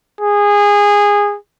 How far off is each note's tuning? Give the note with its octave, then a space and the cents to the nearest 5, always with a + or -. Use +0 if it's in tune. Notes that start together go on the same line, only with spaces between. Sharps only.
G#4 -20